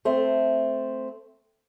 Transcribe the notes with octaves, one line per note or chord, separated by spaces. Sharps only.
A3 C4